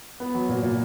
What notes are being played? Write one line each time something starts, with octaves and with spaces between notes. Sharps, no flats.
B3
F#3
A#2
A#2